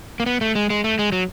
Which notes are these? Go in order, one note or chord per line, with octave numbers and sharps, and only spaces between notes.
A#3
B3
A3
G#3
G#3
A3
G#3
F#3